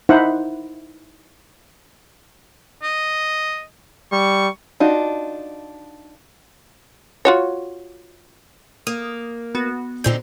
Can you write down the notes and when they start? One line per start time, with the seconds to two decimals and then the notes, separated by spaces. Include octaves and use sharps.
0.09 D#4 E4 C5 F#5
2.83 D#5
4.12 G3 C#6
4.80 D4 D#4 F4 F#4
7.25 F4 F#4 C#5
8.87 A#3 D#6
9.55 B3 F#4
10.04 A#2 D3 C4 D#4 G6